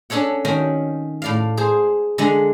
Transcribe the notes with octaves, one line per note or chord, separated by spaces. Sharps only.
C#4 D4 A4 C#5 F#5
D#3 C#4 F#4
A2 D5 F5
G#4 C5
D3 G#3 F#5 G#5